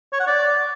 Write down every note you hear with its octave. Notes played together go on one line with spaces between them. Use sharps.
C#5
F#5
D5